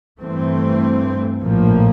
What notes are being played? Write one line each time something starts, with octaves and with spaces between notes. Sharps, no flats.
G2 E3 A3 C4
A#1 A2 F3 A#3